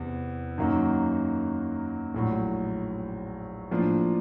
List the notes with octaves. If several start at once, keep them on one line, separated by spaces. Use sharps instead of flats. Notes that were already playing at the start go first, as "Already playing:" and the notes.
Already playing: E2 C3 E3
F#2 D#3 F#3 A#3
A#1 A2 F#3
A2 F3 A#3 D4 F4